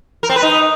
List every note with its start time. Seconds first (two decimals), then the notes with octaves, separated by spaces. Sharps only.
0.23 A#4
0.29 C4
0.36 B4
0.42 D#4